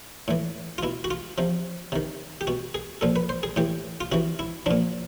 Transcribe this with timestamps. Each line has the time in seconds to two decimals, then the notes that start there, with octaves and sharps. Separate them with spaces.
0.28 A2 E3
0.78 F4
0.83 B2 E4
1.04 F#4
1.11 F4
1.38 C3 F3
1.92 C3 D#3
2.41 G4
2.47 B2 F#4
2.74 G#4
3.01 A#2 F3 A4
3.16 B4
3.29 C5
3.43 G#4
3.56 A2 E3 G4
4.01 F4
4.12 C3 E3 F#4
4.39 E4
4.66 A#2 F3 D4